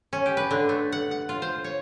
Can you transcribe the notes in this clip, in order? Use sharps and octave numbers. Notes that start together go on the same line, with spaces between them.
C#4
G4
B4
D3
A3
F#5
F#5
F4
C5
C#5